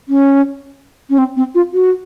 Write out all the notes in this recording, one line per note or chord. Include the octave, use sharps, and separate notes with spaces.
C#4
C#4
C4
C4
F4
F#4